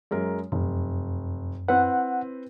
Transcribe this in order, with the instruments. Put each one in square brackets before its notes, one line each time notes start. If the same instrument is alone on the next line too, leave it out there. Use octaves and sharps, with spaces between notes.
[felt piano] F#2 G#3 A#4
[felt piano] F1 [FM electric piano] F#2
[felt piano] C4 E4 B4 [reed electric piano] F#5